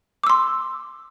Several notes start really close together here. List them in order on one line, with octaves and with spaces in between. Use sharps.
D6 E6 C6